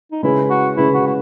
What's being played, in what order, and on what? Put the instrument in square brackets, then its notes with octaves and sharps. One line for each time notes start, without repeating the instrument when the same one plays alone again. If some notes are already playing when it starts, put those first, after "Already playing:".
[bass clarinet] D#4
[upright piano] C#3 G#3 C#4 G#4 B4 [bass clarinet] E4
[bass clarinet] F#4
[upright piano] C#3 G#3 C#4 G#4 B4 [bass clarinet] E4
[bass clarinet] F#4
F#4